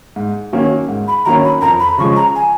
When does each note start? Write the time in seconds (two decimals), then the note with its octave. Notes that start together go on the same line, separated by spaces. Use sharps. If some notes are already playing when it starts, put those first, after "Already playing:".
0.16 G#2
0.53 D#3 F#3 A#3 C#4
0.88 G#2
1.08 B5
1.25 D#3 F#3 A#3 C#4 A#5
1.44 B5
1.62 F2 A#5
1.80 B5
1.98 C#3 F3 G#3 C#6
2.16 A#5
2.36 G#5